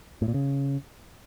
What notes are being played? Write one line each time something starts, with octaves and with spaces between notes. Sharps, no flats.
A2
A#2
C#3